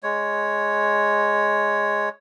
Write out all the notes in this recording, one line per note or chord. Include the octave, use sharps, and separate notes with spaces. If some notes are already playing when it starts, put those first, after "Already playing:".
G#3 C#5